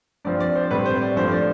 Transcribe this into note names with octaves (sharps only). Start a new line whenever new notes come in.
G2 F3 C4 D5
D5
C5
A2 G3 C4 B4
C5
D5
G2 F3 A3 C5
D5